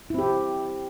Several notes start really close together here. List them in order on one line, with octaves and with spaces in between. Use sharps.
E4 C4 G4